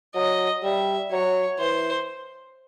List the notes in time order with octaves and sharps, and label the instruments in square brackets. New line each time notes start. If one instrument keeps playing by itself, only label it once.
[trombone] F#3 [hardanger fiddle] D#5
[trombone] G3 [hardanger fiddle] E5
[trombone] F#3 [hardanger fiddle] C#5
[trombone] E3 [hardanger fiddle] C5